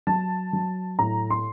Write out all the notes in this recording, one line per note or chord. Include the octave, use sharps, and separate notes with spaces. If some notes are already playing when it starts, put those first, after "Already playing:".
F#3 A5
F#3
A2 A#5
C6